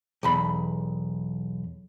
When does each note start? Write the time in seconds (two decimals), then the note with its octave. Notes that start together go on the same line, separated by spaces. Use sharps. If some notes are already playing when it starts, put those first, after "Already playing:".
0.23 B1 E2 B5